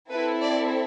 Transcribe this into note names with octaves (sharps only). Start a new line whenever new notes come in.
C4 E4 A4 B4
D5